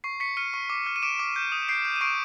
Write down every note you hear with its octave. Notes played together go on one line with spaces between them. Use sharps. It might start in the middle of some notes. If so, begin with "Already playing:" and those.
C#6 C7
C#6 B6 C#7
F6 C#7 D#7
C#6
D6
F6
D#7
D6 D7 E7
D6
G6
D#6
G6 C7 D7
G6
D#7
C#6 C7 D7